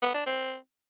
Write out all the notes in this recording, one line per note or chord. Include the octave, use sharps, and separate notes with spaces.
B3
D4
C4